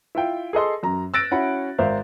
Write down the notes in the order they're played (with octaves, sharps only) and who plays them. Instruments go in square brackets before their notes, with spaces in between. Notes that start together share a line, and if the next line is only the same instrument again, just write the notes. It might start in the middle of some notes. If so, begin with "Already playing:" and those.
[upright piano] E4 F4 G5
G#4 A4 D#5 C6
F#2 A#5
E6 F#6 A6 A#6 D7
C#4 E4 F#4 F#5 B5
G#1 A#4 C5 E5 F5